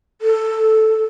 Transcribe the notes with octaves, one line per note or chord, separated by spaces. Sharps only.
A4